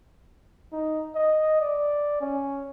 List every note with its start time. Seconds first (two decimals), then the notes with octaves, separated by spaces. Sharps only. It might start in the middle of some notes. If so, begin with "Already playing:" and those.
0.72 D#4
1.15 D#5
1.61 D5
2.21 C#4